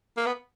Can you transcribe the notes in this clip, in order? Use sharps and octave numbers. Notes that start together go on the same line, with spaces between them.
A#3
B3